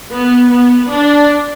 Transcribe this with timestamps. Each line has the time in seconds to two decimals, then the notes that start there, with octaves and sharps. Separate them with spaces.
0.11 B3
0.50 B3
0.90 D4